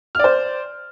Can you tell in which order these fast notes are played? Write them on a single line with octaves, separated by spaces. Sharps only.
F6 D5 C5